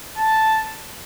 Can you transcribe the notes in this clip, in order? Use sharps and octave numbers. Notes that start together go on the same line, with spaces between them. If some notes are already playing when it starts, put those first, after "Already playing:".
A5